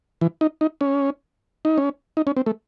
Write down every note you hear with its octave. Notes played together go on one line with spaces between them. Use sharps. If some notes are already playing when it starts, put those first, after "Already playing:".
E3
D#4
D#4
C#4
D#4
C#4
D#4
C#4
C4
A3